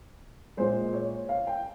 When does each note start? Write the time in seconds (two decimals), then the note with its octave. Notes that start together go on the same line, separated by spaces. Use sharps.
0.57 A#2 G#3 C5
0.93 C#5
1.29 F5
1.47 G5